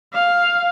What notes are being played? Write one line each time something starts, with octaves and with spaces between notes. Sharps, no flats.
F5